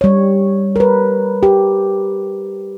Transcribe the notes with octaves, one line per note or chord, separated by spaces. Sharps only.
G3 C#5
A#4 B4
G4